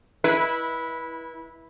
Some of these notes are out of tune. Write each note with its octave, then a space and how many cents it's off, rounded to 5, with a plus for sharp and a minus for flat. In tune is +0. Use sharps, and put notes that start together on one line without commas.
E4 -10 B4 -25